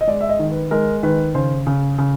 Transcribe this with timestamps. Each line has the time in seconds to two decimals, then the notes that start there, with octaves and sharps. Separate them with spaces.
0.01 D#5
0.07 G#3 D5
0.21 E5
0.29 D#5
0.39 D#3
0.51 B4
0.71 G#3 A#4
1.03 D#3 B4
1.35 C#3 C5
1.67 C#3
1.98 C#3